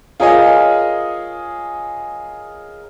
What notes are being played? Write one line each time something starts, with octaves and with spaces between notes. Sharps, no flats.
F4 G#4 A#4 C#5 D#5 G#5